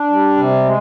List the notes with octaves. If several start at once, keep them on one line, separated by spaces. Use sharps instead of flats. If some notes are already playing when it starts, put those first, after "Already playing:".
Already playing: D4
G3
C3
G#3